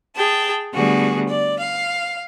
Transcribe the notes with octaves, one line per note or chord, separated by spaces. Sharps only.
G#4 G5 A5
D3 G3 A3 B3 F#4 G#4
D5
F5